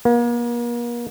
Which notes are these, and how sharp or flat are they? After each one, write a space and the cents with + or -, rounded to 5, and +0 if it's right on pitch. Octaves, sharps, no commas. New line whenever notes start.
A#3 +40